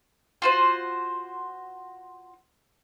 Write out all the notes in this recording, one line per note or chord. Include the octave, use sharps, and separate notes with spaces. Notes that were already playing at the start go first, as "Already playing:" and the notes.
F4 F#4 C5